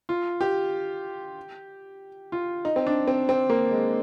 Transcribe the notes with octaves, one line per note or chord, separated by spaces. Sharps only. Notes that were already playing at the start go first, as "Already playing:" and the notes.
F4
G4
F4
D#4
C4
D4
C4
C4
A#3
G#3